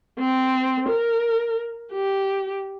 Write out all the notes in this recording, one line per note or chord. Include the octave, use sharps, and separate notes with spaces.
C4
A#4
G4